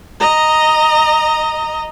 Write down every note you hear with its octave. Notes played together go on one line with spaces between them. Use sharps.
D#5 A#5